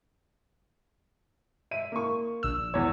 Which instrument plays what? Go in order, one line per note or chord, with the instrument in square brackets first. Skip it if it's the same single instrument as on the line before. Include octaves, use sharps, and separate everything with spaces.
[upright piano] E5 D#7
A#3 C#6
[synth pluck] A#1 E6
[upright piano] E2 C#5